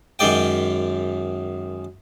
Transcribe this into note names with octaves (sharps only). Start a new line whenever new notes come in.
F#2 D#3 G#3 D5 G5